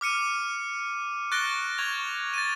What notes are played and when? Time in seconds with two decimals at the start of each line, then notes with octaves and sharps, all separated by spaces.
0.01 D6 F6 C#7 D#7
1.31 C#6 F#6 A6 A#6 D7 G7
1.78 C#6 G#6 F7
2.34 A6 D#7